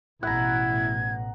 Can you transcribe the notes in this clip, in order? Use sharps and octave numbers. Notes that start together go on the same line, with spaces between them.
A1 B2 E4 F#5 A#5 G#6